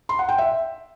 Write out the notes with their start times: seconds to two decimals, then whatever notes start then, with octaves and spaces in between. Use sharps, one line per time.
0.09 C6
0.19 F#5
0.29 G5
0.38 E5